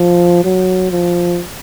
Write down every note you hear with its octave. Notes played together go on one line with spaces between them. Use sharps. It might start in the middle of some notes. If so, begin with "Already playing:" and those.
Already playing: F3
F#3
F3